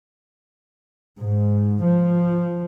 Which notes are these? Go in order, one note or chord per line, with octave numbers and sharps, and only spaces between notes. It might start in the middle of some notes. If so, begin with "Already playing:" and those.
G#2
F3